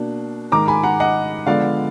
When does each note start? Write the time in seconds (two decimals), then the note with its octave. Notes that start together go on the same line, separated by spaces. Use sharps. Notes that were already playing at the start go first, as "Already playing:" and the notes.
Already playing: B2 A#3 D4
0.52 G#2 D#3 G#3 A#5 D6
0.68 G#5 B5
0.83 F#5 A#5
1.00 D#5 F#5
1.46 D3 F3 G#3 B3 D5 F5